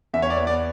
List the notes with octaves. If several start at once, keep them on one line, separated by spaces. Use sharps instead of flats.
E2 E5
C#5
D5
B3
D5